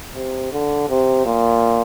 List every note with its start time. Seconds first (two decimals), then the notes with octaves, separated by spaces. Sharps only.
0.15 C3
0.52 D3
0.89 C3
1.25 A#2